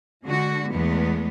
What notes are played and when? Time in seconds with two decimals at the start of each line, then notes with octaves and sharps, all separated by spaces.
0.25 D3 G#3 F#4
0.72 E2 G#3 A3 B3